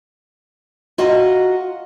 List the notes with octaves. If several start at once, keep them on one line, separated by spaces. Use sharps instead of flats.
F4 F#4 D#5 F5 F#5 A#5